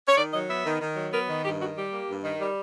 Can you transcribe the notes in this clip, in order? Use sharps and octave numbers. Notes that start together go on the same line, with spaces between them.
C#5
D#3 D5
F#3 D#5
B3 E5
D#3
D#3
F#3
B3 A#4
D#3
G2 G4
D#3 F#4
G3 G4
A#3
G2
D#3
G3